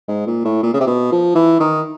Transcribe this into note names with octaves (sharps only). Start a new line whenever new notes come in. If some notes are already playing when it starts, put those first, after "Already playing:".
G#2
A#2
A2
A#2
C#3
C3
B2
F3
E3
D#3